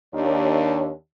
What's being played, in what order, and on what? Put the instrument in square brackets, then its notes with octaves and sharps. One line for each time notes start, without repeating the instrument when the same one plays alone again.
[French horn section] D#2 D4 C#5